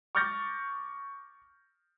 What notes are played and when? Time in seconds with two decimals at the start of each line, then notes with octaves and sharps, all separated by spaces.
0.15 C#6 D6 F6 G6 A6 A#6